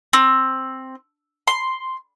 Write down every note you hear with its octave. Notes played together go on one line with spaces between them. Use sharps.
C4
C6